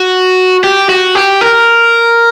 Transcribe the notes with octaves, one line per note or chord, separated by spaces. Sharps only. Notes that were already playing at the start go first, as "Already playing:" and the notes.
Already playing: F#4
G4
F#4
G4
A#4